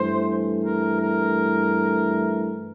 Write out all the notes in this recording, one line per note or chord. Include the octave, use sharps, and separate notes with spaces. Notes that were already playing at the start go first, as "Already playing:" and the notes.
Already playing: G2 E3 A3 C5
A#4
A#4